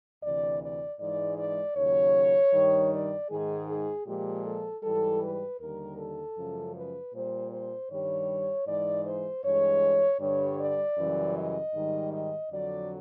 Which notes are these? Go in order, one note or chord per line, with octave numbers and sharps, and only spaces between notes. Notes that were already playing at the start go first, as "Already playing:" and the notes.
D2 C3 E3 D5
D5
G#2 E3 G#3 D5
D5
D#2 C#3 F#3 C#5
G2 D#3 G3
D5
G#2 D#3 G#3 G#4
G#4
A#2 F3 G#3 G4
A4
G#2 E3 G3 A4
B4
D#2 D3 G3 A#4
A4
F#2 C#3 F3 G#3
B4
A#2 G3 C5
C5
G2 D#3 G3 C#5
G#2 E3 G#3 D5
C5
G2 E3 G#3 C#5
G2 D3 G3 C#5
D5
F#2 C#3 E3 G3
D#5
G#2 D#3 G3
D#5
F2 D3 F#3 D5